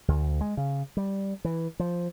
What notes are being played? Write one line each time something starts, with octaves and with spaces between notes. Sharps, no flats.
D2
G#3
C#3
G3
E3
F3